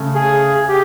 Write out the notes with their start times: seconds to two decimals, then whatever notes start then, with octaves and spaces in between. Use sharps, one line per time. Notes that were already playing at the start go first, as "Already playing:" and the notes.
Already playing: C#3 A3
0.15 G#4
0.68 G4